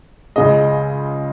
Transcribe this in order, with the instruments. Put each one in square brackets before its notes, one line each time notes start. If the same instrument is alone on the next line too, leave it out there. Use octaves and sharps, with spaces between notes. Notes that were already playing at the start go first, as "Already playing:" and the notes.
[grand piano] C#2 C#3 G#3 D#5